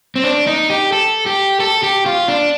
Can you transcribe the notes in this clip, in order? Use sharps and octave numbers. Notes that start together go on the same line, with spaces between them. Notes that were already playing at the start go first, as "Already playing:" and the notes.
C4
D4
D#4
G4
A4
G4
A4
G4
F4
D4